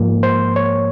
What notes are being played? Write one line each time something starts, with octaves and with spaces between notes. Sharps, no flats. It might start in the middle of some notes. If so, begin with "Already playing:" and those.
Already playing: G#2 F3 A#3
C5
C#5